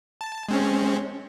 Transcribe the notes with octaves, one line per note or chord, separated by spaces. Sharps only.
A5
G#3 C4 C#4